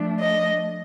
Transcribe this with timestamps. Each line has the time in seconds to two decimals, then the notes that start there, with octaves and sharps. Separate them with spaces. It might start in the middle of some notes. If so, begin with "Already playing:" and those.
Already playing: F3 A3 D4
0.20 D#5